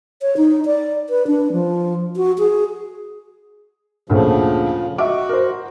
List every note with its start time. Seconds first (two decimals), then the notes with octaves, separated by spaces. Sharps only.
0.22 C#5
0.37 D#4
0.66 D5
1.10 B4
1.27 D4
1.52 F3
2.17 F#4
2.39 G#4
4.10 D2 A#2 C#3 F3 A3
4.98 F#4 D#5 E5 D6
5.29 A#4 C5